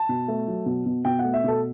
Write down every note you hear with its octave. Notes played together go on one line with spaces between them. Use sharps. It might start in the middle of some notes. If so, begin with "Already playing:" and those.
Already playing: A5
B2
A3
F#3
B2
B2
B2 G5
A3 F#5
E5
B2 A4